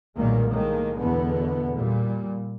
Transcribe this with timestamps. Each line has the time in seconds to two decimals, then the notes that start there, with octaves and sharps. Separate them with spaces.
0.17 B1 A#2 D#3 G3 G#3 A#3
0.49 A2 D#3 G#3 A#3
1.00 E2 B2 D3 B3
1.74 A#2 G3